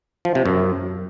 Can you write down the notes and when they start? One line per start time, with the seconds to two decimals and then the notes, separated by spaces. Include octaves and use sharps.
0.25 F3
0.35 C3
0.46 F#2